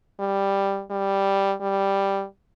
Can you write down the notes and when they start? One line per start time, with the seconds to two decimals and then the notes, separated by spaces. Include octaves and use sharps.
0.20 G3
0.91 G3
1.61 G3